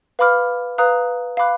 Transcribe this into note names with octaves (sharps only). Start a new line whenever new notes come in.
B4 F5 B5 D6 F6
B4 F5 A#5 D#6 F#6
F5 B5 D6 F#6